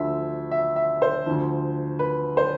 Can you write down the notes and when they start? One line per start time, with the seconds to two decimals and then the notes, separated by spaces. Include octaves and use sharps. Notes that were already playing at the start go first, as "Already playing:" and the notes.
Already playing: D2 D3 F3 E5
0.51 E5
0.76 E5
1.02 C5
1.26 D2 D3 F3
1.99 B4
2.37 C5